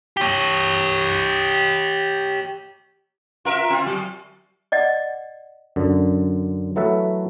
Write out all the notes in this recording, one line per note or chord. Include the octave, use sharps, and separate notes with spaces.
G4 C#5
F4 A#4 E5
C4 F4
F#3
D5 D#5 F#5
F#2 D3
E3 F#3 A3 A4 B4 E5